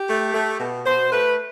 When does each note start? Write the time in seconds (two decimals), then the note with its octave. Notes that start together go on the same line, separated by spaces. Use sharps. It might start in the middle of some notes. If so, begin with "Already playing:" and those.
Already playing: G4
0.08 A3
0.34 A3
0.60 B2
0.86 B2 C5
1.11 A3 B4